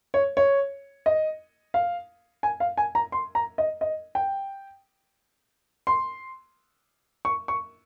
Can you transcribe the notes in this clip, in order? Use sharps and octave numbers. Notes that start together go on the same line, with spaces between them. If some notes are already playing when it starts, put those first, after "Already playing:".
C#5
C#5
D#5
F5
G#5
F5
G#5
A#5
C6
A#5
D#5
D#5
G5
C6
C#6
C#6